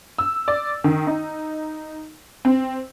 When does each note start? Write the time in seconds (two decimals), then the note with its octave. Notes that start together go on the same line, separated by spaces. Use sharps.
0.18 E6
0.48 D5
0.84 D#3
1.07 D#4
2.45 C4